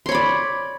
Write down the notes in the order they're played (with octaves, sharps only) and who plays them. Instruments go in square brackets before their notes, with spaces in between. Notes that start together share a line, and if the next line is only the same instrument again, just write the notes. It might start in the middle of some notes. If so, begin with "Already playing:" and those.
[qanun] C6
C#5
B5
D5